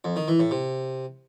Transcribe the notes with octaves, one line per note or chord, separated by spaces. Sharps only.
F2
D#3
E3
A2
C3